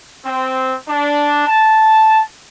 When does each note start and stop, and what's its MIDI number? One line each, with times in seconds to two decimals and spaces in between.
0.25 0.75 60
0.88 1.45 62
1.47 2.22 81